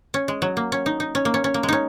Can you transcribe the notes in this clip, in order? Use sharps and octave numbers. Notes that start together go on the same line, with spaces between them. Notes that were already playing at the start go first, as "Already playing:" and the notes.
C#4
G#3
F#3
A#3
C#4
D#4
D#4
C#4
A#3
C#4
C#4
A#3
G#3
C#4 D#4